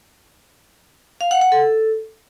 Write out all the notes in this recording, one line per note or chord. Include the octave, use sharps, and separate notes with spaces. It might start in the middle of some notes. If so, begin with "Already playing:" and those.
F5
F#5
F#5
A4